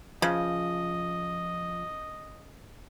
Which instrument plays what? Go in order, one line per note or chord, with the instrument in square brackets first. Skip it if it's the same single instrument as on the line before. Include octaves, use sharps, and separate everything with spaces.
[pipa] C#3 [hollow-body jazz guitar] F3 [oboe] D#5